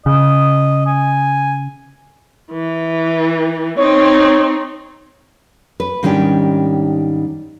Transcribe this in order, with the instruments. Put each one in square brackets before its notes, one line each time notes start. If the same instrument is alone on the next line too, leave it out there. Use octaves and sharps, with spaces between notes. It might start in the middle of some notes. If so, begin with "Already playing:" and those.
[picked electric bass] C#3 [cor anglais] D#5
[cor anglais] G#5
[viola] E3
[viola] C4 D#4 [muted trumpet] C#5
[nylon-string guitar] B4
G#2 D#3 G3 C#4 D4 G4